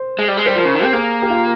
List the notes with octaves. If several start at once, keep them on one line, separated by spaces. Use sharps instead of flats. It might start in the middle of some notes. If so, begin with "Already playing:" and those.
Already playing: C5
G#3
G3
G#3
G3 C5
F3 A#4
C#3
D#3
C4 G4
A#3 G#4
G4
F4